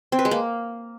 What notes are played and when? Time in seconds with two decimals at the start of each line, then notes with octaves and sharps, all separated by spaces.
0.12 C4
0.19 B4
0.25 G#3
0.31 A#3